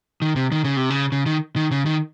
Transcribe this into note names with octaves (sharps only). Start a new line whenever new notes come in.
D#3
C3
D#3
C#3
C3
C#3
C#3
D#3
D#3
C#3
D#3